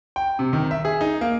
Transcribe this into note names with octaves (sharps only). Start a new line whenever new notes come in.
G5
C3
D#3
E5
G#4
D#4
A#3